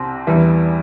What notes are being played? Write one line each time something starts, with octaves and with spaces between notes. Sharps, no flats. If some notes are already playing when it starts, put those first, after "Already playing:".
Already playing: C2 C3 C4
E2 E3 G3 E4